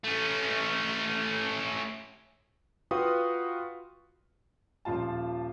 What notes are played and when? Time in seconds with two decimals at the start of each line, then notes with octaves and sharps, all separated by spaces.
0.04 A3 C#4
2.91 F4 F#4 B4 F5 G5 D#6
4.85 D#1 F3 F4 A5